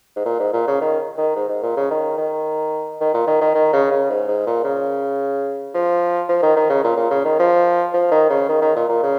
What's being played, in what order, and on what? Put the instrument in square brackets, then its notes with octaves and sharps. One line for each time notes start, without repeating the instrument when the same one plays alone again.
[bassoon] G#2
A#2
G#2
A#2
C#3
D#3
D#3
G#2
G#2
A#2
C#3
D#3
D#3
D#3
A#2
D#3
D#3
D#3
C#3
C#3
G#2
G#2
A#2
C#3
F3
F3
D#3
D#3
C#3
A#2
A#2
C#3
D#3
F3
F3
D#3
C#3
D#3
D#3
A#2
A#2
C#3